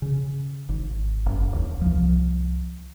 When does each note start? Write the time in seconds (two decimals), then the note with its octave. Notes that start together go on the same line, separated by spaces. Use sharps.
0.02 C#3
0.69 G#1
1.26 F#1
1.52 D1 D#2
1.81 C2 F3